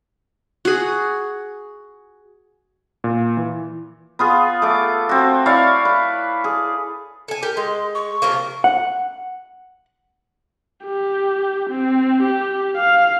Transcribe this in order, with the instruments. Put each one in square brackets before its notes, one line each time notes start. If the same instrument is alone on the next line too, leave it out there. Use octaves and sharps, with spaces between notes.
[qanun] F#4 G#4
[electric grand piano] A#2
E3
[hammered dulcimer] B3 F4 G#4
A3 D6
C4 F#4
E4 C#5 D5 F5
B4
G#4
[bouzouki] A4 G#5
[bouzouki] G4 [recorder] A#4
[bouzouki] G#3 [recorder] C6
[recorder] C#6
[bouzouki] C3 F3 A#3
[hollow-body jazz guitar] F#5
[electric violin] G4
C4
G4
F5